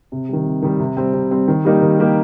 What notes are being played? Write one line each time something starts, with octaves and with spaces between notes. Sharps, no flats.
C3
D#3 G3
C3
D#3 G3
C3
G3 C4
C3
G3 C4
D#3
G3 A#3 D#4 G4
D#3
G3 A#3 D#4 G4